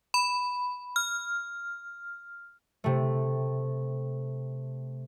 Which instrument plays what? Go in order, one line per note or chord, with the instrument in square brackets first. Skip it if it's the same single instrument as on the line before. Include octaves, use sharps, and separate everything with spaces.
[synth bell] B5
F6
[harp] C3 A3